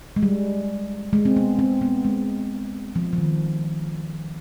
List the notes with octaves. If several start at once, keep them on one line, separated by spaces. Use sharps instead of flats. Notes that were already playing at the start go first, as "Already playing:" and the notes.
G#3
G3
G#3
C4
B3
C4
B3
G#3
F3
F3
D#3